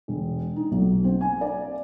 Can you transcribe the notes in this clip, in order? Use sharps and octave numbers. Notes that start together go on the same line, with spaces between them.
E1
D#4
B1
C4
G#5
D5